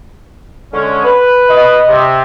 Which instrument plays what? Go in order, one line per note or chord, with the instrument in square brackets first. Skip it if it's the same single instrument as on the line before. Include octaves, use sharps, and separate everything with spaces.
[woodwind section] D3 G#3 C#4
B4
[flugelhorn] D#5
[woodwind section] C3